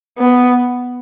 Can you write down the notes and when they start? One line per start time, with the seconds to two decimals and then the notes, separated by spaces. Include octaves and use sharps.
0.18 B3